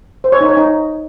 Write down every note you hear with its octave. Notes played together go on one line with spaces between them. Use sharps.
C5
C#5
D#4
C#5
D#4